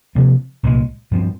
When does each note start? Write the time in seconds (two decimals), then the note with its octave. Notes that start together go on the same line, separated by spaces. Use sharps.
0.15 C3 F3 A#3
0.63 C2 A#2 G#3
1.11 G2 F3 C4